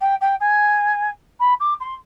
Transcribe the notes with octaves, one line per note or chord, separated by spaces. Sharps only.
G5
G5
G#5
B5
D6
C6